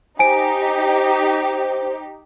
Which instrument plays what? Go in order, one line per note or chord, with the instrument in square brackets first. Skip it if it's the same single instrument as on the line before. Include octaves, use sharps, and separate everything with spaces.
[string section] D#4 G4 [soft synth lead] C5 [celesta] G#5 D7